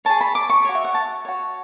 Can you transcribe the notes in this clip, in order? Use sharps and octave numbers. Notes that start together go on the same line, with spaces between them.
G#4 C#5 A5
B5
D6
C#6
F#4 C#5
E5
F#5
A5
F#4 C#5